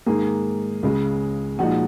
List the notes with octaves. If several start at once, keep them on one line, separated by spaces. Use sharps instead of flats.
G#2 D#3 A#3 G#4
C#2 C#3 G#3
A#2 F3 G#3 D#4 F#4